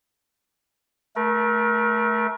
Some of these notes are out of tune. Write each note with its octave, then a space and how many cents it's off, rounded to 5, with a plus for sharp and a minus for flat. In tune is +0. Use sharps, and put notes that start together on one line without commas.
A3 -10 A#4 +30